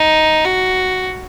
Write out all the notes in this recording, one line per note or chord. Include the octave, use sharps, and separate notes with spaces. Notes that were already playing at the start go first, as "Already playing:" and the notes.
Already playing: D#4
F#4